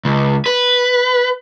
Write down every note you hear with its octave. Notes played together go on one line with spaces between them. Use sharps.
C#2
B4